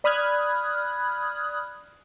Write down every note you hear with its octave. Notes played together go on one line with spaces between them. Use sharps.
D5 B5 D#6 F6 F#6 G#6